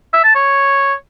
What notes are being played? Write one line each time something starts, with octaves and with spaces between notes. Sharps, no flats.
E5
A5
C#5